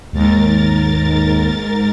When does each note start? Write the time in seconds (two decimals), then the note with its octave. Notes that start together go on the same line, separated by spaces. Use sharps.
0.13 D#2 G#2 A#4 A6